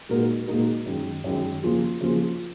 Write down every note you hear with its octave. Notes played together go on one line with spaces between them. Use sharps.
A#2 G#3 D#4 F#4 A#4
A#2 G#3 D#4 F#4 A#4
F#2 D#3 G#3
F#2 D#3 G#3
C#3 F3 A#3 F4 G#4
C#3 F3 A#3 F4 G#4